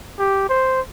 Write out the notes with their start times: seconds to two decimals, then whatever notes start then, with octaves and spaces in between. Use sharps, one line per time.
0.19 G4
0.49 C5